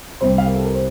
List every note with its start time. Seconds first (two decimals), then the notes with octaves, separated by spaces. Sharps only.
0.20 C2 C3 G3 C4 C5
0.38 F5
0.47 A#4
0.56 A4
0.65 A#4
0.74 C5